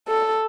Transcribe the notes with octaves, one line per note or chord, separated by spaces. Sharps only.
A4